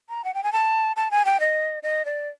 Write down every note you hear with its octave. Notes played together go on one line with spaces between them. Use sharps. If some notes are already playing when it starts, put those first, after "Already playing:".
A#5
F#5
G5
G#5
A5
A5
G#5
G5
D#5
D#5
D5